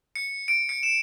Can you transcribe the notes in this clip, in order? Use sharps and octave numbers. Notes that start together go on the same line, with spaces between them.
C#7
D7
C#7
E7